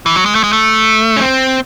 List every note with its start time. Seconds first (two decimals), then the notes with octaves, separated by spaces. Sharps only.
0.06 E3
0.16 F#3
0.26 G#3
0.35 A3
0.44 G#3
0.53 A3
1.17 C#4
1.21 C4